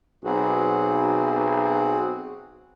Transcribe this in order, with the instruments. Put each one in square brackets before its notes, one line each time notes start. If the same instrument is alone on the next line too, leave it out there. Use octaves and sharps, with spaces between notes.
[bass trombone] B1 [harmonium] C4 F#4 G#4